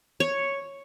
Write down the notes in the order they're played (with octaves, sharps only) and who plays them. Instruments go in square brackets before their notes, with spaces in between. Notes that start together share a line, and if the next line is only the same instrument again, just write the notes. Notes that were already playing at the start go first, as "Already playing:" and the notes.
[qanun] C#5